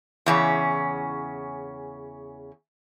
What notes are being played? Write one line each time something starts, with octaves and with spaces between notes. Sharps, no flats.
E2 C#3 C#4